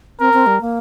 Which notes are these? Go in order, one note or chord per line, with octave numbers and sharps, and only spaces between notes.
C4 A#4
C4
G3
A#3